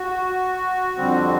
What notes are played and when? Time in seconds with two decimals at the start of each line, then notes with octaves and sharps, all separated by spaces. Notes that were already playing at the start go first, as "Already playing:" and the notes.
Already playing: F#4
0.97 F2 D3 G3 C4